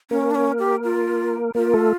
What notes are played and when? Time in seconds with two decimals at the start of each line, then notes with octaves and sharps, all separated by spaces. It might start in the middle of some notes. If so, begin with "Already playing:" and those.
0.11 A#3 C#4 A#4
0.31 D4
0.35 C#4
0.59 G4
0.84 F4
1.55 A#3 F4 A#4
1.74 A3 A4